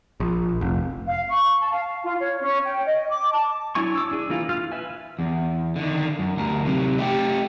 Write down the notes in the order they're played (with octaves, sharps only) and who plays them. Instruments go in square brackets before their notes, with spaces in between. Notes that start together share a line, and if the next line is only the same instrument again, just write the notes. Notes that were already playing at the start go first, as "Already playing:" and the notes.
[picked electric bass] A#1
F1
[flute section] F5
C#6
A5
F5
F4
C#5
C#4
G5
D#5
D6
A5
[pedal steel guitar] F#3 D4 E4 G#5 C#6
D6 E6
D4 G#4
E3 A#3 F4
F4 F6
B4 E5 G#5
[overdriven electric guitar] E2
D3 D#3
F#2
D2 A#4
C3 F#3
A3 G4